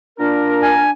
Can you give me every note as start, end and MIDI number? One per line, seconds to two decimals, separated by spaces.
0.19 0.82 46
0.19 0.92 62
0.19 0.82 70
0.62 0.90 80